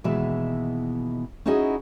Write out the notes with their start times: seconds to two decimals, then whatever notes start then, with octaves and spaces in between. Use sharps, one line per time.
0.04 D#2 B2 E3 G#3 E5
1.46 C#4 D#4 E4 F#4 G#4 D#5